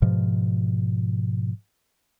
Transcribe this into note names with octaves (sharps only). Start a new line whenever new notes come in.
G#2 B2 F3